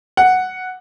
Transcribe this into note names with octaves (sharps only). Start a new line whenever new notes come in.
F#5